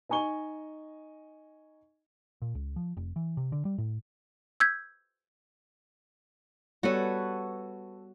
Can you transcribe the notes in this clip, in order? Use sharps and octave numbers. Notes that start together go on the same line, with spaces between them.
D#4 D#5 G#5 C#6 G7
A#2
C#2
F3
F1
E3
C3
D3
G3
A2
E6 G6 G#6 B6
G3 B3 F#4 A4 B4 C#5